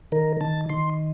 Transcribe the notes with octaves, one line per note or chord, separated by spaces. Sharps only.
D#3 A#4
D#3 A5
D#3 C6